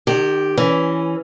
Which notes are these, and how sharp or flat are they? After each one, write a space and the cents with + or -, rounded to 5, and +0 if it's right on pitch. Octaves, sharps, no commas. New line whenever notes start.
D#3 -40 G4 +0
E3 +5 C#4 +10